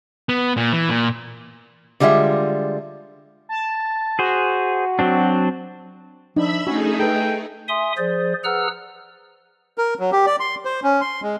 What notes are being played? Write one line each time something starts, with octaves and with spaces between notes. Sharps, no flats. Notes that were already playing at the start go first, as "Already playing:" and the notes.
B3
A#2
E3
A#2
D3 G3 G#3 F4 E5
A5
F#4 G#4 C5
F#3 C4 D4
F3 D4 D#4 E5 B5 E6
A3 C#4 D#4 F#4 G#4
A4 B4 G5
E5 G#5 C6 D#6
F3 G#4 C5 D5
G#4 B4 F#5 A#5 E6 F6
A#4
F#3
G4
D5
C6
C5
C#4
C6
G#3